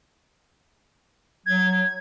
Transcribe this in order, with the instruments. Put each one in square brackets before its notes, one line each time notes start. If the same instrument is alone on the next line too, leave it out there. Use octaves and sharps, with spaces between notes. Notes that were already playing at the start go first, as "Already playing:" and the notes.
[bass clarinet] F#3 [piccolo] G#6